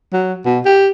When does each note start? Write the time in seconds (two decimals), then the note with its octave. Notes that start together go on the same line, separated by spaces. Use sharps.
0.13 F#3
0.45 B2
0.65 G4